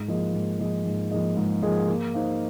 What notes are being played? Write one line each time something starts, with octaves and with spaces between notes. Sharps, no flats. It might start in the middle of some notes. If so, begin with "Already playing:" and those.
Already playing: G#2
F3 A#3 G#4 D#5
G#2
F3 A#3 G#4 D#5
G#2
F3 A#3 G#4 D#5
G#2
F3 A#3 G#4 D#5
A#3
D#4 C5 F5